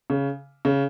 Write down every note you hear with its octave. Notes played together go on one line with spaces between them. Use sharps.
C#3
C#3